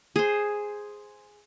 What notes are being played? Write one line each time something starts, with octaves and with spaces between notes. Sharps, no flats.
G#4 C5